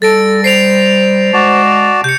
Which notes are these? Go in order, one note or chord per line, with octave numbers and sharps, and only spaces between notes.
G3 A4 A6 A#6 D7
C5 C7 D7 F7
G#3 F#4 D5 A5
C3 G6 C#7